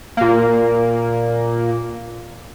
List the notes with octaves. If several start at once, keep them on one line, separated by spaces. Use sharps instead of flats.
A#2 A#3